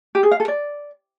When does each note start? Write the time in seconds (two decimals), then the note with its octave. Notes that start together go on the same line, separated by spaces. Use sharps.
0.15 G4
0.23 G#4
0.31 F5
0.40 A4
0.48 D5